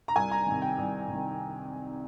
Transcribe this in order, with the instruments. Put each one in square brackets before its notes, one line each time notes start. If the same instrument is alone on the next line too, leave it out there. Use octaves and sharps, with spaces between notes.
[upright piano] A#5
C2 G#5
A#5
C3 D#3
G5
C2
C3 D#3